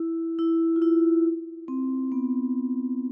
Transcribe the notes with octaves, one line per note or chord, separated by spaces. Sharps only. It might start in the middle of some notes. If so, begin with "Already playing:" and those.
Already playing: E4
E4
F4
E4
C4
B3